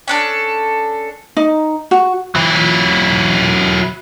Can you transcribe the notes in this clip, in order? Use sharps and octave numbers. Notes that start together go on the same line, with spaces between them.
C#4 D4 A4
D#4
F#4
F#3 E4